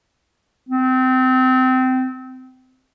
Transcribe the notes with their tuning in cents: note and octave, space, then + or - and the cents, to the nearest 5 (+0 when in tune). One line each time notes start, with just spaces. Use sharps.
C4 -25